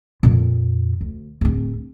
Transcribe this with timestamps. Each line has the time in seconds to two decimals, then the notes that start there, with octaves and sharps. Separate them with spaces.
0.23 F2 A#2
1.01 D2
1.41 D1 C4